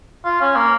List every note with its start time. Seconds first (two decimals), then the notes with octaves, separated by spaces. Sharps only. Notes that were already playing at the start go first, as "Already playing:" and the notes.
0.25 F4
0.41 C#4
0.56 A#3